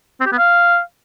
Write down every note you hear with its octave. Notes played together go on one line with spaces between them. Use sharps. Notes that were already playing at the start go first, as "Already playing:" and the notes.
C4
G4
B3
F5